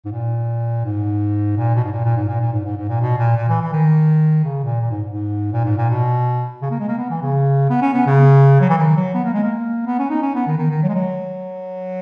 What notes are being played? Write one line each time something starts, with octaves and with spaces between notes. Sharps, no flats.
G#2
A#2
G#2
A#2
B2
G#2
A#2
A#2
G#2
A#2
A#2
G#2
G#2
G#2
A#2
B2
A#2
A#2
E3
E3
D#3
C#3
A#2
A#2
G#2
G#2
A#2
G#2
A#2
B2
C#3
A#3
G#3
A#3
B3
E3
C#3
B3
C#4
B3
C#3
F#3
E3
D#3
F#3
B3
A#3
G#3
A#3
B3
C#4
D#4
C#4
B3
D#3
D#3
D#3
F#3
G#3
F#3